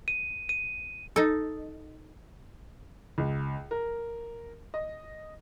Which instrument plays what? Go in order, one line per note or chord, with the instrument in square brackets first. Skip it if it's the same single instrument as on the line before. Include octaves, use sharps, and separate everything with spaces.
[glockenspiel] D#7
D#7
[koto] D#4 A4
[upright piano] C#2
A#4
D#5